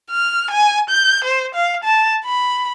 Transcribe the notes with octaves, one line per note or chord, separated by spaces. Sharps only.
F6
G#5
G6
C5
F5
A5
B5